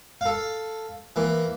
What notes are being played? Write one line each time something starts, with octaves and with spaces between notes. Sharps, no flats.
A4 F5
E3 A#3